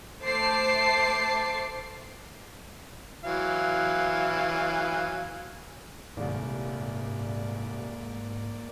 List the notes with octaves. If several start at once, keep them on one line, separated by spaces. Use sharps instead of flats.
A3 C5 A5 D6 C7
E3 F#3 F5
D#1 C2 G#2 A#3 D5